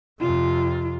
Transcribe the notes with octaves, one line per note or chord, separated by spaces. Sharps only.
F2 C3 F4